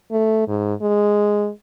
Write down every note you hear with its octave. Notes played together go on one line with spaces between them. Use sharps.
A3
G#2
G#3